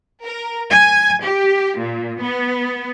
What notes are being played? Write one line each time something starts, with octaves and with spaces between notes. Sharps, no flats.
A#4
G#5
G4
A#2
B3